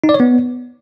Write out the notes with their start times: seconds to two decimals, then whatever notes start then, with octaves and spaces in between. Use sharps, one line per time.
0.04 D#4
0.09 D5
0.14 C#5
0.20 B3